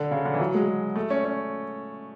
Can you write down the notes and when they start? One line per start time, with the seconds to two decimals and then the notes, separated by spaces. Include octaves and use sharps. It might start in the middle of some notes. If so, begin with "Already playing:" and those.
Already playing: D3
0.11 C#3
0.25 D3
0.34 E3
0.40 F#3
0.55 G#3
0.96 A3
1.10 C#4
1.25 C#4